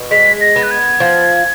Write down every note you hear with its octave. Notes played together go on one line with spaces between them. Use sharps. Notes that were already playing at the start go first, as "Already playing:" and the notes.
Already playing: B2
G#3 B6
A#6
B3
F#6
G#6
F3